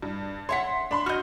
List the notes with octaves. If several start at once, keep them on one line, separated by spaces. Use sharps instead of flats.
G2
C#5 E5 F#5 C6 B6
D4 B5 C6
F#4 D#5 F6 G6